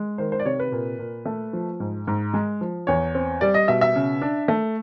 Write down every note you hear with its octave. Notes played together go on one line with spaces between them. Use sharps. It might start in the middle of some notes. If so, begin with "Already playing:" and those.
Already playing: G#3
D#3 C5
C5
D5
C3 C#5
B4
A#2
A#2
A3
F3
G#2
G#2
G#3
F3
E2 C#5
C4
G3 D5
D#5
B2 E5
E5
C#3
D4
A3